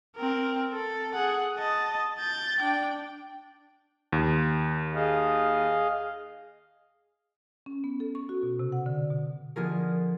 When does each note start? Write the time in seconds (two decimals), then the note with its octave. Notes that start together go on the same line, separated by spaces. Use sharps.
0.17 C4 A#4
0.73 A4
1.14 G#4 F#5
1.58 D#5 A5
2.19 G6 A6
2.60 D4 G5
4.12 D#2
4.94 G#4 D#5 F5
7.66 C#4
7.84 B3
8.00 A4
8.15 C#6
8.29 F#4
8.43 B2
8.59 C3
8.72 F#5
8.86 D3
9.10 B2
9.56 D3 F3 B3 F4 G#4 A#4